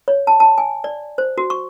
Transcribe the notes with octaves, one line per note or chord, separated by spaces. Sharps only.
C#5
A5
A5
G#5
D5
C5
F#4
C#6